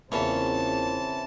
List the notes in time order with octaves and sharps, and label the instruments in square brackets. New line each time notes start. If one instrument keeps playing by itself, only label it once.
[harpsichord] E2 A#2 C#4 [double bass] C#3 C4 [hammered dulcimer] E3 C#6 [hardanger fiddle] A5